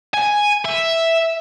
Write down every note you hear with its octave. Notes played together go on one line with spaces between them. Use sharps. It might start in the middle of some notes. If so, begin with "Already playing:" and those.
G#5
E5